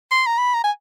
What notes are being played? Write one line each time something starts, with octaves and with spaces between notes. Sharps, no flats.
C6
A#5
B5
A#5
G#5